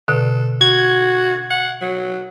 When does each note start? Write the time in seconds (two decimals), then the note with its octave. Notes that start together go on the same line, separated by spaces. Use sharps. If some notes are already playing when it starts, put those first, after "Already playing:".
0.08 B2 D3 A4
0.61 F#4 G#6
1.50 F#5
1.81 F#3